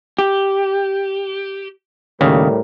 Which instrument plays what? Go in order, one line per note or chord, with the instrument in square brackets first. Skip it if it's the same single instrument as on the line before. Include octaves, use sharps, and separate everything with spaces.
[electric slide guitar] G4
[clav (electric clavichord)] D#2 C#3 [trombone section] A2 G3 A#4